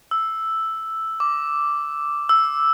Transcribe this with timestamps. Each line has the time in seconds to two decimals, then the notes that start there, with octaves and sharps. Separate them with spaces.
0.11 E6
1.20 D6
2.29 E6